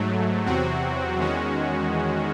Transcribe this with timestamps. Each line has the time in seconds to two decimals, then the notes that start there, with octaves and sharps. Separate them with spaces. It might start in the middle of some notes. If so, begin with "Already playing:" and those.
Already playing: G#2 F#3 A3
0.46 E2 C3 F#3 C4 F#4
1.18 E2 D#3 G#3 C#4 F#4